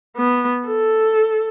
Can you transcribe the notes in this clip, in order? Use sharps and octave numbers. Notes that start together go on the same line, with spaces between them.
B3
A4